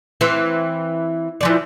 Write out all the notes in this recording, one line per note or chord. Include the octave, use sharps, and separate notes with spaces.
E3 C4
E3 F3 D5